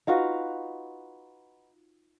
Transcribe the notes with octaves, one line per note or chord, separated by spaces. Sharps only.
D#4 F4 F#4 B4